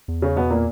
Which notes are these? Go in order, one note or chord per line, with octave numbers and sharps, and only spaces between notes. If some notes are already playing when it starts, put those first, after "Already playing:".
E2
C#3 C#4
B2 B3
A#2 A#3